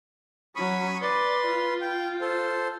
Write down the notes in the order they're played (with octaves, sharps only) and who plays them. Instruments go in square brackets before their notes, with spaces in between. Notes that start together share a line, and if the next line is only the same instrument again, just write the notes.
[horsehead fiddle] F#3 C#4 [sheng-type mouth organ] B5 C#6 D#6
[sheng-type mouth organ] B4 C6 [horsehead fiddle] D5
[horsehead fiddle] F4
[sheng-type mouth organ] G5
A4 C5